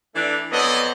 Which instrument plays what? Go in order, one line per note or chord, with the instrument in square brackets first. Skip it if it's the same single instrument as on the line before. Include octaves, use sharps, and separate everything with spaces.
[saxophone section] E3 A3 D4
[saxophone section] F2 F#3 B3 [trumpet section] A4 D5 D#5